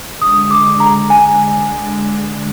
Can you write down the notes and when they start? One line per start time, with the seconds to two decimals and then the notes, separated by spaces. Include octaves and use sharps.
0.22 D3 G#3 D4 D#6
0.51 D6
0.80 A#5
1.10 G#5